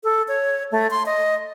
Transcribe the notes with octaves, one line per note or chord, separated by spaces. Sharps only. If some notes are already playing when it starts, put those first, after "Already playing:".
A4
C#5
A3
C6
D#5